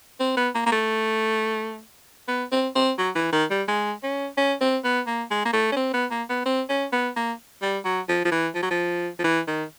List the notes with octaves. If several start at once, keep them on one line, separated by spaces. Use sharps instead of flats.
C4
B3
A#3
A#3
A3
B3
C4
C4
F#3
E3
D#3
G3
G#3
C#4
C#4
C4
B3
A#3
G#3
A#3
A3
C#4
C4
B3
A#3
B3
C4
C#4
B3
A#3
G3
F#3
F3
F3
E3
F3
F#3
F3
F3
E3
D#3